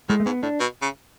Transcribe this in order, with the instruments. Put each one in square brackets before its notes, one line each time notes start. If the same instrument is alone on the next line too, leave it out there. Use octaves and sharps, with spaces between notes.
[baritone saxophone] A2 [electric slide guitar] G#3
[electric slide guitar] A3
[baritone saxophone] G#2 [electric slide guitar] B3
[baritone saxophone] A2 [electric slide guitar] D4
[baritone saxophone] B2
C#3